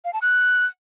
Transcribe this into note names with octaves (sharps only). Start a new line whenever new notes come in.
F5
A5
F#6